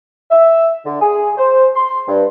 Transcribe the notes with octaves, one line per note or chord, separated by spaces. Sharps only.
E5
D3
G#4
C5
C6
G2